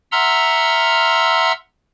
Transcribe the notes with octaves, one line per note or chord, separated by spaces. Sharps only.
E5 F#5 A#5 C6 E6 F6